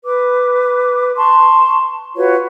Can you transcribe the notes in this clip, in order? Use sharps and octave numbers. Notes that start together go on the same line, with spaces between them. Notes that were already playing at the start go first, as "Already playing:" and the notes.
B4 D6
A5 C6 C#6
F4 F#4 B4 C#5